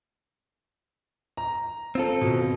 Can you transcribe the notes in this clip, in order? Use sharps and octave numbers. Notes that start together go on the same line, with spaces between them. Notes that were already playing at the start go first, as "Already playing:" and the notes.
A#5
C4 F4 A4
B2